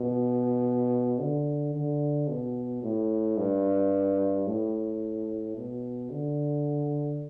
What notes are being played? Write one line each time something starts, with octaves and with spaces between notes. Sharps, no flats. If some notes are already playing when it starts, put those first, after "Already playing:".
Already playing: B2
D3
D3
B2
A2
G2
A2
B2
D3